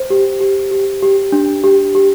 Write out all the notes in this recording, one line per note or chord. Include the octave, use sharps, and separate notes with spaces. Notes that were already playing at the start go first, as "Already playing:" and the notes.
Already playing: C5
G4
G4
G4
G4
D4
G4
G4